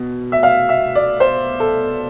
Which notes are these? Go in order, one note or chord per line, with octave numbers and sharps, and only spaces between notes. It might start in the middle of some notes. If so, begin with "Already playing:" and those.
Already playing: B2
E5
F5
E5
D5
C5
A4